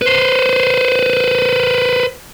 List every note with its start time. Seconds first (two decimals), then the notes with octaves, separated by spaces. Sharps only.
0.02 B4 C5